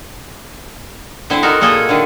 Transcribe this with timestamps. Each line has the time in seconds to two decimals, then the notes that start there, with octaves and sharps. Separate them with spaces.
1.30 D3 C4 E4 C5
1.42 D#4 F#4 A4 A#4
1.61 A#2 A#3 G#4 A4 D#5
1.89 D3 D#3